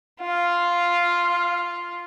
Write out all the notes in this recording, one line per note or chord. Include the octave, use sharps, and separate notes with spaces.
F4 F5